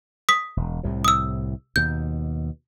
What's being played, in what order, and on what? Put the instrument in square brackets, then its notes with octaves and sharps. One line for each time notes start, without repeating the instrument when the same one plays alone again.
[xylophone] D#6 B6
[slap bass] E1
C2 A2 C3
[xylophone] D#6 E6
[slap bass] D#2 B2 [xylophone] G6